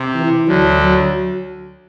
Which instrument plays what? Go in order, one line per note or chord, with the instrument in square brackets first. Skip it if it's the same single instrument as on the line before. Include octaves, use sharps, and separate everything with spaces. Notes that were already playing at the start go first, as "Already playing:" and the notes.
Already playing: [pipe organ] C3
[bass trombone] E3
[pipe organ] D2 D3 [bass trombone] F#3
[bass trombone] F#3